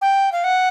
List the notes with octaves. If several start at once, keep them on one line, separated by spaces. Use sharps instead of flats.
G5
F5
F#5